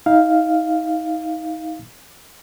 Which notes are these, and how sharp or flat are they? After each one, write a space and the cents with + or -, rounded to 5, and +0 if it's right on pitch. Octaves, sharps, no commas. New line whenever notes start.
D#4 +30 F5 +0